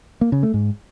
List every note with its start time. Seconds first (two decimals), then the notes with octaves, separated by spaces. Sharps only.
0.21 A#3
0.32 C#3
0.43 A3
0.54 G#2